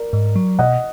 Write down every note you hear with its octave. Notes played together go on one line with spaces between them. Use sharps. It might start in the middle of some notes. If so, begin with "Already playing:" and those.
Already playing: A#4 D5
G#2
F#3
B2 D#5 F#5